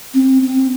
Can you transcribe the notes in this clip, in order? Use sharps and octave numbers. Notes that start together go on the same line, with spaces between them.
C4
C4